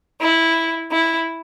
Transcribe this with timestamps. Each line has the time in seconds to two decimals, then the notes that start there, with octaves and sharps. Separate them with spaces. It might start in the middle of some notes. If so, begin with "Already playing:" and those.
0.20 E4
0.92 E4